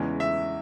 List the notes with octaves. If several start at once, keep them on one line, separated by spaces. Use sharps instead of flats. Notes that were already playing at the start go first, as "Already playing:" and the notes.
Already playing: E2 C#3 E3 G#3 C#4
E5